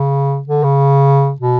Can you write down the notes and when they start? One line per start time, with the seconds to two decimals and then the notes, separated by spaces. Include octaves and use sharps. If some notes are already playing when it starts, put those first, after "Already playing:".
Already playing: C#3
0.48 D3
0.63 C#3
1.41 B2